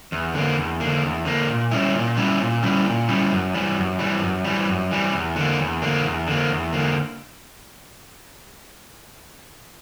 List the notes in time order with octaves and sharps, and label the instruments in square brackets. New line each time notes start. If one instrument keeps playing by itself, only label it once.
[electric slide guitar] E2
D3 A#3
E2
D3 A#3
E2
D3 A#3
A#2
G3 C#4 E4
A#2
G3 C#4 E4
A#2
G3 C#4 E4
A#2
G3 C#4 E4
F#2
E3 G3
F#2
E3 G3
F#2
E3 G3
F#2
E3 G3
E2
D3 A#3
E2
D3 A#3
E2
D3 A#3
E2
D3 A#3